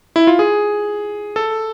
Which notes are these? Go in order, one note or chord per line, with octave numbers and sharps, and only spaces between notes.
E4
F4
G#4
A4